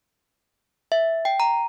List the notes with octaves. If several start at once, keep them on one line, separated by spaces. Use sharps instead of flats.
E5
G5
A#5